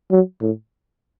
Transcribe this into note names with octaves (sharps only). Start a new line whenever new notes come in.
F#3
A2